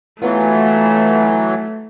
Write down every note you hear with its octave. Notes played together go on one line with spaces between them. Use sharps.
E3 F#3 A3 B3 F4